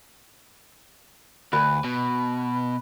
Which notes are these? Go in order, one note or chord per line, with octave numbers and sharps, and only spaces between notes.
D2 B4
B2